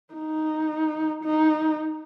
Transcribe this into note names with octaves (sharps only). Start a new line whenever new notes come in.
D#4
D#4